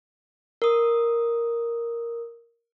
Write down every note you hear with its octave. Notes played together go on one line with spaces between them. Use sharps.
A#4 D#6